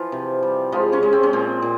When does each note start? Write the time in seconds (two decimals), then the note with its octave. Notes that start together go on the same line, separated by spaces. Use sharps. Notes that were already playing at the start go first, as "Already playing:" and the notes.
Already playing: E3 F3 F4
0.12 C3
0.43 G3
0.72 F3 G#3 F4
0.92 C#3 C#4
1.03 G#3
1.13 C4
1.23 C#4
1.33 A#2 C4
1.62 A#2